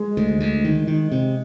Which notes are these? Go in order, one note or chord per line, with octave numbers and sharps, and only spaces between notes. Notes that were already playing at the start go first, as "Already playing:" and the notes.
Already playing: G#3
D2
D2
D#3
D#3
C3